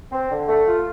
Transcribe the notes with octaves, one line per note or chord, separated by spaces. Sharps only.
C4
D3
A3
F4